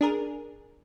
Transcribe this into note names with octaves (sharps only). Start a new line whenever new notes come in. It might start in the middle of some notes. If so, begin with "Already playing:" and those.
D4 G#4 A#4